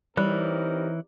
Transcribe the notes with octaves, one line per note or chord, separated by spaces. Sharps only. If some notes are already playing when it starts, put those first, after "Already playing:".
E3 G3 C4 D#4 A#4 C#5 F#6